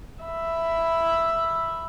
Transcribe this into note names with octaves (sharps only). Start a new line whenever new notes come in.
E5 B5